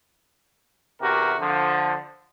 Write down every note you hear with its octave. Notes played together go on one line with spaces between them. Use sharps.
E2 C3 F#4 G4 A#4
D3 F3